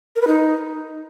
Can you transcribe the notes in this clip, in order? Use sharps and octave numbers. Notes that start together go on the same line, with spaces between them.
A#4
B4
D#4